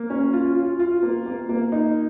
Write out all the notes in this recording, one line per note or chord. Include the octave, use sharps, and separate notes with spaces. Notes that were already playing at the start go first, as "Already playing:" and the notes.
Already playing: A#3
C#4
F4
F4
F4
A#3
A#3
A#3
D#4